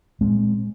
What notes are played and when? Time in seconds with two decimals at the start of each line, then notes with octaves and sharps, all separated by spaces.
0.21 A#2 G#3 C4